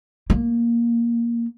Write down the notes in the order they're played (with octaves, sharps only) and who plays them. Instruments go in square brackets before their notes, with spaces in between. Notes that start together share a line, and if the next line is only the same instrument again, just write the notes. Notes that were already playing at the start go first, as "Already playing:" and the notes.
[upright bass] A#3